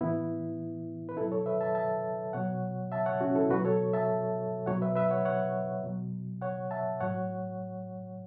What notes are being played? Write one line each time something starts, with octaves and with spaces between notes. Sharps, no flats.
A2 E3 B3 E4
B4
B2 F#3 E4 A4
A4 C#5
B4 E5
E5 A5
E5 A5
B2 F#3 C#5 F#5
E5 A5
C#5 F#5
C#4 F#4
E4 A4
B2 F#3 F#4 B4
A4 C#5
E5 A5
B2 F#3 C#5 F#5
B4 E5
B4 E5
C#5 F#5
C#5 F#5
B2 F#3
C#5 F#5
E5 A5
A2 F#3 C#5 F#5